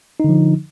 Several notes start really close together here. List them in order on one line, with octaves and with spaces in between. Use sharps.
D#4 D3 F3